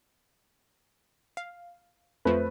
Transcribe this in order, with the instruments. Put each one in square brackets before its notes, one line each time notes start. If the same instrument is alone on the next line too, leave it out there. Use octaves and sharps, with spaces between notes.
[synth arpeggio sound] F5
[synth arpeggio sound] F2 F3 [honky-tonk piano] A3 B4